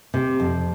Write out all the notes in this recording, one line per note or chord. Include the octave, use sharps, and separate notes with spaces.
C3
F2